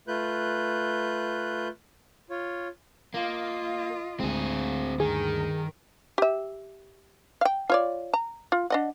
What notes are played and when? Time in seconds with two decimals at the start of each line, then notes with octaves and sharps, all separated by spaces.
0.08 A3 F4 B4 F#6 G6
2.30 F4 C#5
3.14 A#3 F4 D#5
4.20 D2 G#3 C4 G#4
5.00 G2 D#3 G#4 A#4
6.18 G4 E5
7.41 F5 G5
7.70 F4 C#5 D5
8.13 A#5
8.52 F4
8.70 D4 D#5 F#5